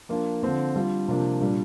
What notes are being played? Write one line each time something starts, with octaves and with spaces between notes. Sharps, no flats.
F3 A#3 D4 F4
D3 F3 C4 F4
G3 D4 F4
C3 F3 A#3 D4
A#2 G3 D4